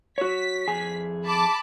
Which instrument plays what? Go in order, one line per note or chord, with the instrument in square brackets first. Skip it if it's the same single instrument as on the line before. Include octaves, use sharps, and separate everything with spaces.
[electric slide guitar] F#4 C#5 [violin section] B6
[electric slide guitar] F2 G#4 G#5
[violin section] A5 B5 D6